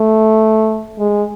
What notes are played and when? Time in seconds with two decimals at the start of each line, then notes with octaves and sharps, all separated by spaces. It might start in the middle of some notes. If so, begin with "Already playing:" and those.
Already playing: A3
0.99 G#3